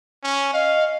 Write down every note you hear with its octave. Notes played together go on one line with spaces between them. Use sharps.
C#4
D#5 F5